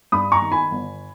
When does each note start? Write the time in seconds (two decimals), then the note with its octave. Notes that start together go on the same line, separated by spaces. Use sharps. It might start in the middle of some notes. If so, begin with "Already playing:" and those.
0.12 G2 B5 D#6
0.32 A#5 C#6
0.42 D#3
0.52 G#5 B5
0.71 G1